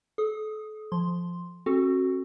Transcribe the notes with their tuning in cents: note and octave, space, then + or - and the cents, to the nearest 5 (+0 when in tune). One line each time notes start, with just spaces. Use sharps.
A4 -35 D#6 +0
F3 +0 C6 +0
C4 +45 F#4 +0 A4 +0